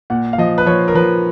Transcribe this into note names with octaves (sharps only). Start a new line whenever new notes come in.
A#2 F#5
F5
F3 D#5
B4
F3 C#5
A#4
F3 B4